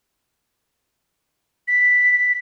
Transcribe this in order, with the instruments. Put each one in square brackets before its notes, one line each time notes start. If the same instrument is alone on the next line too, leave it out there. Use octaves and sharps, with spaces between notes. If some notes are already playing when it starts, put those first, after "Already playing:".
[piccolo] B6